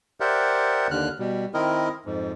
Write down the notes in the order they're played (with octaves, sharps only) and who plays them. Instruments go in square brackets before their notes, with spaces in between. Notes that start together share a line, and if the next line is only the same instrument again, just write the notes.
[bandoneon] G4 A#4 C5 D5 E5 F#5
D#2 D3 F6 F#6
B2 G3
D#3 C4 E4 A#4 D#5
F2 G#2